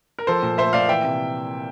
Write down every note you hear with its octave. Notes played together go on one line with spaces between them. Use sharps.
A#4
F3 A4 C5
A#2
A3 C5 E5
A#2 D5 F5
E3 E5 G5
C3